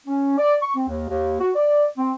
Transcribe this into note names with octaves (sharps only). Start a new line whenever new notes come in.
C#4
D5
C#6
C4
D#2
D#2
F#4
D5
C4